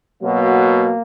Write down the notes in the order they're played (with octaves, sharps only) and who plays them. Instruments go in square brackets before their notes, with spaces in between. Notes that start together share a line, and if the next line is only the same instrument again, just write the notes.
[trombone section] B2 F#3 A#3